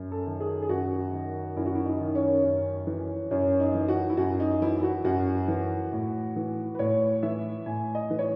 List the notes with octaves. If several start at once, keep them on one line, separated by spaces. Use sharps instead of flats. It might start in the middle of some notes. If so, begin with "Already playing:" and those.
Already playing: F#2
A4
D#3
G#4
G#4
F#2 F#4
D#3
F#2 E4
F#4
E4
D#4
D#3
C#4
F#2
E3
F#2 C#4
D#4
E3
F#4
E4
F#2 F#4
D#4
E3 E4
E4
F#4
F#2 F#4
E3
A2
E3
B4
A2 C#5
E3 E5
A2 G#5
D#5
E3
C#5